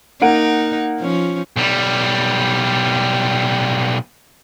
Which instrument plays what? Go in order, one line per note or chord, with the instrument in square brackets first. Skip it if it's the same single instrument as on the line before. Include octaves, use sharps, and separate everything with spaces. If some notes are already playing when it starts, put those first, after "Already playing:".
[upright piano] A#3 F#5 D7 [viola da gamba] D#4
[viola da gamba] F3 C#4
[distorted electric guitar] B1 G3